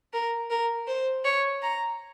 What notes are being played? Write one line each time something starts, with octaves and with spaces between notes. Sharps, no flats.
A#4
A#4
C5
C#5
A#5